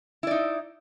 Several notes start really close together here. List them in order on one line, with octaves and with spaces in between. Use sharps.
E4 D5 D#4